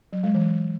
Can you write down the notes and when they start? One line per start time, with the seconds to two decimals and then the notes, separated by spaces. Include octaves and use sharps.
0.13 F#3
0.23 G#3
0.34 E3